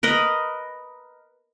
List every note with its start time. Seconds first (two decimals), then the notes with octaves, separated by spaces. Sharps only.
0.03 A#4 B4 D#5